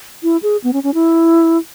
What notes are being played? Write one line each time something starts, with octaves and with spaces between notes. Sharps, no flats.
E4
G#4
B3
C#4
C#4
E4